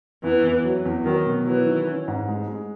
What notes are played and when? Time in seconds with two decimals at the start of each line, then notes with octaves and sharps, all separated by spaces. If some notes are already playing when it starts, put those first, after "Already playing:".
0.23 E2 E3
0.44 E2
0.64 F#3
0.86 E2
1.05 D#3 F#3
1.26 B2
1.46 E3 F#3
1.66 D#3
1.87 C#4
2.08 G#2
2.28 G#3
2.48 G#3